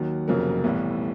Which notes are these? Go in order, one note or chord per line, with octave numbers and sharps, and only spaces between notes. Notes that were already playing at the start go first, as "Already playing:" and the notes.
Already playing: D#2 D#3 F#3
F1 F2 C#3 F#3 A#3
B1 A2 E3 G3